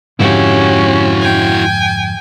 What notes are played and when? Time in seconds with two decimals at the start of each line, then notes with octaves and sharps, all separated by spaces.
0.20 F2 G#2 D3 C#4 E4 F#4 G4
1.21 G5 G#5